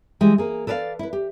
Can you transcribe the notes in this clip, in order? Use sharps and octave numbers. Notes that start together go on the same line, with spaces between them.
E3 G3 G#3 G4
A#3 G#4
A4 B4 D5 D#5 F5
E4 B4
G4